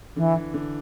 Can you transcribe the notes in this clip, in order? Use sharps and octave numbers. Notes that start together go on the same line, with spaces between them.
D3 E3
E3
D3